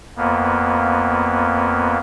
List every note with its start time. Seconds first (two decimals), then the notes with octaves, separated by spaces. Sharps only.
0.17 F2 A#3 B3